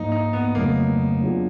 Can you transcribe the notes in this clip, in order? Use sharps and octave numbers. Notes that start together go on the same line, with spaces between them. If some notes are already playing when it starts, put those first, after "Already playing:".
Already playing: G#2 F3 A#3 D#4
D#4
B3
F2 C#3 F#3 A3 A#3 C#4
F#3 B3 D4 F4 G#4